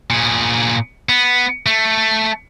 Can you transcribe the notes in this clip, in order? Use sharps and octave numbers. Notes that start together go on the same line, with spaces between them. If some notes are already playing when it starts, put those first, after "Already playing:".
A#2 G#4
B3
A3